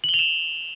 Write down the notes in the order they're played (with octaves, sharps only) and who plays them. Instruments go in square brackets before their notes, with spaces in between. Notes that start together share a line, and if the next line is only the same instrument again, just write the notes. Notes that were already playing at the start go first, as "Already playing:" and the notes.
[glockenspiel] F#7
G7
F7
E7